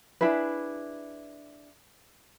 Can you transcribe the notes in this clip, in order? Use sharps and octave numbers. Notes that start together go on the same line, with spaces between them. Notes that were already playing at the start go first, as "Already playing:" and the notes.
D4 E4 G#4 B4